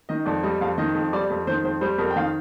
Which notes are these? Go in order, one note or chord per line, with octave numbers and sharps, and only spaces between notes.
D#3 D#5
F2 D5
G3 D#5
F2 F5
D#3 D#5
F2
G3 D5
F2
D#3 C5
F2 C5
G3 C5
F2 A#4
G5
D#3 F5